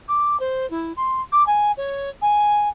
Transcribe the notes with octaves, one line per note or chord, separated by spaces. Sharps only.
D6
C5
E4
C6
D6
G#5
C#5
G#5